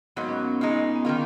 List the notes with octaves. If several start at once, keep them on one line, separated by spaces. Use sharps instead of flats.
G#2 F#3 A#3 B3
C#4
B3
A#2 G#3 D#4
B3
D#3 A#3 C#4 F4